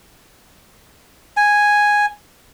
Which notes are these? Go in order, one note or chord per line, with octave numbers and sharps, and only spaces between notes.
G#5